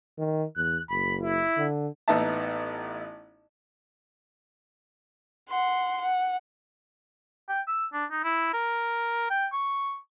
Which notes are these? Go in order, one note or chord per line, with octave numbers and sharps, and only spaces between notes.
D#3
E2 F#6
F#1 B5
E4
D3
A1 B3 D#4 D#5 E5 A5
F#5 C6
F#5
G5
E6
D4
D#4
E4
A#4
G5
C#6